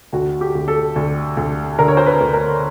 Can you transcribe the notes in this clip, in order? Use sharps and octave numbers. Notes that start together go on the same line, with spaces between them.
D2 F#4
G4
D2
A4
D2
D2
D3 A#4
C#5
C5
B4
D2
A#4